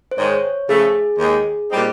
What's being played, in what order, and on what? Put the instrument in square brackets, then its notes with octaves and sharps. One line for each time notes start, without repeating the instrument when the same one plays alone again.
[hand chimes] C5
[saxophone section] G#2 D#3 G#3 [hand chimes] C#5
[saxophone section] C#3 F3 A3 [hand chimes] G#4
[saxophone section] D#2 D#3 G#3
A#2 G3 C4 D#4 G4